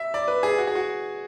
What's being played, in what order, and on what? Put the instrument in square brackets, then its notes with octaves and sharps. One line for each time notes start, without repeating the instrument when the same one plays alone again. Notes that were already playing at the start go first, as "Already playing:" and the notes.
Already playing: [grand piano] E5
D5
B4
G#4
F#4
G#4
F#4